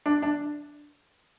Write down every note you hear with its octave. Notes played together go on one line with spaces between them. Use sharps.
D4
D4